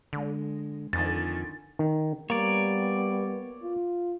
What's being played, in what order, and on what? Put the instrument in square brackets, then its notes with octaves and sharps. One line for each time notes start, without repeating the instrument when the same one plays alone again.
[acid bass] D3 [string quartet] G#3
[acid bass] F2 [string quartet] D3 D#3 G#5 [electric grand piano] A6
[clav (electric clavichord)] D#3
[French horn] G3 [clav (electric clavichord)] A#3 [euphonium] B3 [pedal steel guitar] C#5 D5
[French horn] F4